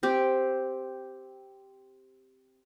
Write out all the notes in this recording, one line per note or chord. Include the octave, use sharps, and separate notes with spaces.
C4 G4